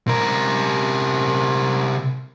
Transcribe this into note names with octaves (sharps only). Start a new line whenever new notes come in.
C3 A#4